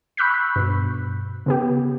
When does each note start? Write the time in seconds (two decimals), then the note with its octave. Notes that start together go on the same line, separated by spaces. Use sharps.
0.17 B5 C#6 E6 F#6 G6 B6
0.56 G2 B2
1.46 C#3 B3 G4